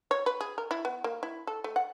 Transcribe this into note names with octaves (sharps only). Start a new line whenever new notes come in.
C#5
B4
G#4
A#4
E4
B3
A#3
E4
A4
A3
F#5